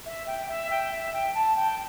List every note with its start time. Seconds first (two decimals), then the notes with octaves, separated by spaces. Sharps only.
0.06 E5
0.27 G5
0.49 E5
0.71 G5
0.91 E5
1.13 G5
1.35 A5
1.57 G5